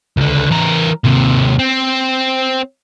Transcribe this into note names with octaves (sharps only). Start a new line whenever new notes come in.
C#2 D3
E3 A#4
D#2 C3
C4